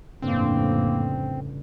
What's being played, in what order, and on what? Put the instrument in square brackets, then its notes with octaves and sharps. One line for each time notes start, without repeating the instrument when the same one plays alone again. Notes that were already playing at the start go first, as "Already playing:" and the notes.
[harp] G1 C#3 D4 [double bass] F2 A2 [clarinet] A#3 [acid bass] C4